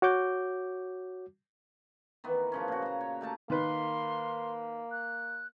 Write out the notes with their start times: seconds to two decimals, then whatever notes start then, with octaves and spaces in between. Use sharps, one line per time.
0.02 F#4 C#5 D6 G6
2.24 D#3 E3 B3
2.52 C#3 F3 C#4
2.68 A#2 F#4
2.82 A#2 A#5
3.01 C#5
3.21 A3 G4 A5 A#5
3.50 D#3 A#3 B4 C6
4.91 F#6